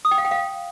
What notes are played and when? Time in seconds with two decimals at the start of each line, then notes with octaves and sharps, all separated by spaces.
0.05 D#6
0.11 G5
0.18 F5
0.25 G5
0.31 F5